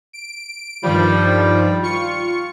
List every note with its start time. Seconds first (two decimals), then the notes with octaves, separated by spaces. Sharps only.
0.13 D7
0.83 G2 D#3 F3 G3
1.83 F4 C#6 C#7